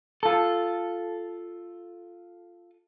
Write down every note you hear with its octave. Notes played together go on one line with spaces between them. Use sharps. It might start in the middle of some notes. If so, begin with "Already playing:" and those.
F4 A4